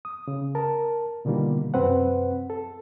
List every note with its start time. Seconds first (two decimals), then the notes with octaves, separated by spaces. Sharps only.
0.05 D#6
0.28 C#3
0.55 A#4 A5
1.25 B2 D3 D#3 G3 A#3 F4
1.74 F#2 C3 C4 B4 C5 F#5
2.50 A4